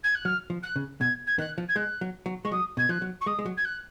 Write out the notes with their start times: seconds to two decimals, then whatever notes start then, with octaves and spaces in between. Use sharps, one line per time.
0.03 G#6
0.14 F#6
0.25 F#3 F6
0.50 F3
0.62 F#6
0.76 C#3
1.00 B2 G#6
1.26 G#6
1.38 D#3 F#6
1.58 F3
1.68 G#6
1.76 G#3 F#6
2.01 F#3
2.26 F#3
2.44 G#3 C#6
2.52 F#3 D#6
2.77 B2 G#6
2.89 F3 F#6
3.02 F#3
3.21 C#6
3.26 G#3 D#6
3.39 G#3
3.46 F#3
3.57 G#6
3.64 F#6